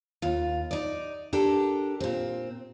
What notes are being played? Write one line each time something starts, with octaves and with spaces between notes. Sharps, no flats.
D#2 F4
D#4 D5
D4 G4 A4 A#4
A#2 C4